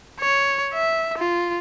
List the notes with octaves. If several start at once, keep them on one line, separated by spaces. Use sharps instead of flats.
C#5
E5
F4